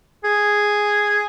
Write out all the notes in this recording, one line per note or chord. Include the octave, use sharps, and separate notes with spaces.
G#4